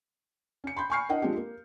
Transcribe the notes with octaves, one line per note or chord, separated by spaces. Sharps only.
C#4 C#7
B5 C6 G6
G#5 B5 C#6 F6 C7 C#7
D4 E4 A#4 D#5 F#5 G5
F3 G#3 C4 D4 G4
A#3